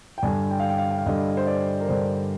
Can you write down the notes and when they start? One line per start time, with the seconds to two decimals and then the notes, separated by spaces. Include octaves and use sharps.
0.18 G5
0.23 G2 D3 G3 G#5
0.50 G5
0.59 F5
0.69 G5
0.78 F5
0.91 G5
0.98 F5
1.06 G2 D3 G3 D#5
1.37 C5
1.47 D5
1.81 A#4
1.88 G2 D3 G3 C5